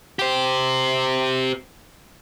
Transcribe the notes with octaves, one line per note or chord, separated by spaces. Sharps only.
G4 C5